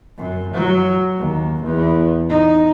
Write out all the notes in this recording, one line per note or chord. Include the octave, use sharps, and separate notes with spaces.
F#2
F#3
D#2
E2
D#4